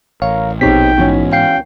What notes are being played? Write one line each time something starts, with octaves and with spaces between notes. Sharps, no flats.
A1 A#4 C#5 F5
A#1 B2 C4 D#4 G4 C#5 G5 B6
G#2 E3 B3 C#4 F#4
F5 G5 C7